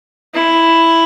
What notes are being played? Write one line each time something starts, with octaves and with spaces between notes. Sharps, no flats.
E4